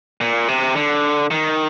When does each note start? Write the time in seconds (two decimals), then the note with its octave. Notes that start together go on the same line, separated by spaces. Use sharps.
0.21 A#2
0.48 C3
0.76 D3
1.31 D#3